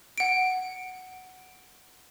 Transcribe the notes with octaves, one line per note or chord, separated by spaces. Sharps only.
F#5 D7